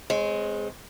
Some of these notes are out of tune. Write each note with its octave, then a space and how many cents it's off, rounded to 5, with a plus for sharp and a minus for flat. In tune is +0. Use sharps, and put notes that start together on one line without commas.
G#3 +0 C4 -30 C#5 -35